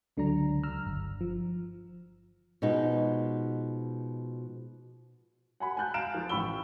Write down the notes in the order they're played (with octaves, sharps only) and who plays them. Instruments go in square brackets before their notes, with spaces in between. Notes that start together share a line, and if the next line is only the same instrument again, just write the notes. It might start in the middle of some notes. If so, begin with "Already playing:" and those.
[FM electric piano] C#2 D3 F#3 D4 A#5
A#5 E6 F6
G1
F3
[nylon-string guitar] B2 F3 G#3 D#4
[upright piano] F#5 G#5 B5
G#5 A5 F#6 G6
F5 A#5 F6 D7 E7
F3 F4
A1 G5 B5 C#6 E6 G7